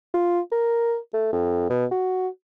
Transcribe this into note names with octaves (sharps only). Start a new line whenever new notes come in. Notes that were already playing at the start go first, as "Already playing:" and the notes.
F4
A#4
A3
F2
B2
F#4